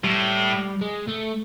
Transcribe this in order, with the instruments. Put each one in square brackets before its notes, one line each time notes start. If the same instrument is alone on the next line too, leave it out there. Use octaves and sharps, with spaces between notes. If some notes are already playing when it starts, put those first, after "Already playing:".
[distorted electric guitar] A2 [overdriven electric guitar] G3
[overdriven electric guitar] G#3
A3